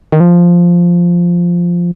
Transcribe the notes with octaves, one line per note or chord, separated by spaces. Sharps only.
D#3
F3